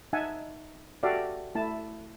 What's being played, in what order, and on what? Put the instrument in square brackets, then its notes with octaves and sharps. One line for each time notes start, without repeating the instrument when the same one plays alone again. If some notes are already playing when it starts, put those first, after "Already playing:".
[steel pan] D#4 E5 F#5 G#5 A5
F#4 G4 A4 D5 E5 F5
A3 E4 A5